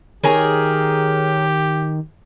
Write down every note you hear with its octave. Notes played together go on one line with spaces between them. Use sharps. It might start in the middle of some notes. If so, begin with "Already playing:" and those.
D#3 G4 G#4 A#4 C#5